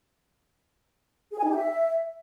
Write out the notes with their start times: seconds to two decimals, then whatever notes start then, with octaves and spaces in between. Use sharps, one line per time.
1.32 G#4
1.38 G#5
1.44 D#4
1.50 G4
1.56 E5